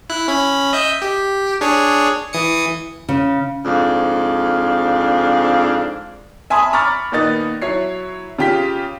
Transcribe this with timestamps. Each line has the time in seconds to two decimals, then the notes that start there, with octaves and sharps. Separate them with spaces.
0.10 E4 F#6
0.28 C#4 B5
0.73 D#5 E5 G6
1.02 G4
1.61 D4 G#4 C#5
2.33 E3 D#6 C#7
3.09 C#3
3.65 F2 G#2 D4 F5
6.50 E5 G#5 A5 B5 C6 D#6
6.73 A#5 B5 C#6 D6 F6 A6
7.12 A#2 D#3 B3 D#4 A6
7.62 F#3 E4 C#5 C7
8.39 C#3 F4 G4 G5 B6